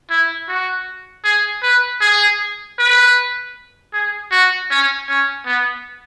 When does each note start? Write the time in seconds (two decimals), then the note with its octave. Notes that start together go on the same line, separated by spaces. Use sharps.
0.10 E4
0.48 F#4
1.24 G#4
1.63 B4
2.01 G#4
2.79 B4
3.93 G#4
4.32 F#4
4.70 C#4
5.09 C#4
5.46 B3